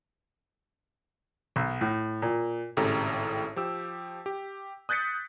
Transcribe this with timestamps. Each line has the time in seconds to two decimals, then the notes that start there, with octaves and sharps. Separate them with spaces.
1.56 B1
1.81 A2
2.22 A#2
2.77 G#1 A2 C#3 G4 A4 A#5
3.56 F3 G4 E6
4.26 G4
4.89 D#6 F#6 G6 A6 B6 C#7